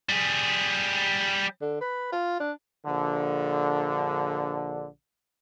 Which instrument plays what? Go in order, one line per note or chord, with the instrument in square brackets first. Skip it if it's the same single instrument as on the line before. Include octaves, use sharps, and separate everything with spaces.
[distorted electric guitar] G3 G#4
[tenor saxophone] D3
B4
F4
D4
[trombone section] A#1 D3